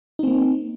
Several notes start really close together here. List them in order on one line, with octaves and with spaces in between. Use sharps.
D#4 C4 A#3